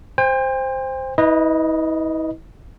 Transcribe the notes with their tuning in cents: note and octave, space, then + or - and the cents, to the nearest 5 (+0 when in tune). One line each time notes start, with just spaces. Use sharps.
C5 +0 G5 +40
E4 -40 B4 +0 D#5 +0